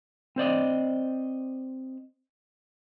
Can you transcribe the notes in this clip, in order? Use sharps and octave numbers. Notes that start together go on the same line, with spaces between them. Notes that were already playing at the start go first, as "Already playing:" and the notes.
C4 C5 D5 D#5